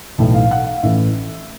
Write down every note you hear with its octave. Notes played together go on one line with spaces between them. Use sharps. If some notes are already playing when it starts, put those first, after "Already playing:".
B1 A2 E3
F5
F#5
F5
A1 A2 E3 E5